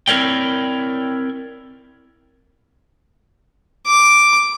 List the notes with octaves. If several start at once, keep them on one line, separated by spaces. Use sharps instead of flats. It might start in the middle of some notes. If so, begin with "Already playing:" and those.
C4 E4 A#4 C#5 D5 G5
D6